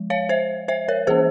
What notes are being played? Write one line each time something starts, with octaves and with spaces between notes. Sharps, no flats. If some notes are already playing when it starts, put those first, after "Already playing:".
Already playing: F3 G#3
C#5 F5
C5 E5
C5 E5
A#4 C#5
E3 A#3 C#4 G#4 C5